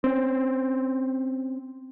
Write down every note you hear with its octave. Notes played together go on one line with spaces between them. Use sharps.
C4 C#4